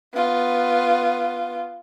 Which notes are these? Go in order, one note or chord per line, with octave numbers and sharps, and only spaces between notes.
B3 F4